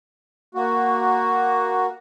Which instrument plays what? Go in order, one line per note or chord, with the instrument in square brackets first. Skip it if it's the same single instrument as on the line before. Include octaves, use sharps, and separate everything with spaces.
[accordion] A#3 F#4